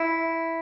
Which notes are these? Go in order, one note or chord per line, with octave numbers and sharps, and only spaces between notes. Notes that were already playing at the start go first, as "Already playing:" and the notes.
Already playing: E4